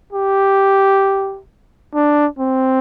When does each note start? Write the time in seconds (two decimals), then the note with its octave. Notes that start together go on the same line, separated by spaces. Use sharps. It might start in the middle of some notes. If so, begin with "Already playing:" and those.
0.13 G4
1.95 D4
2.39 C4